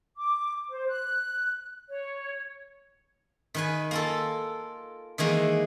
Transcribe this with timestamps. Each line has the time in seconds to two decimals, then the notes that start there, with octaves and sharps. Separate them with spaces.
0.18 D6
0.71 C5
0.89 F#6
1.89 C#5
3.54 D#3 B4 G#5
3.91 A#3 F4 A4
5.18 D#3 E3 G#3 A#3